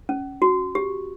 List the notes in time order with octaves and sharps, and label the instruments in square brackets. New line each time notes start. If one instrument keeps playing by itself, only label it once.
[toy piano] C#4
F#4
G4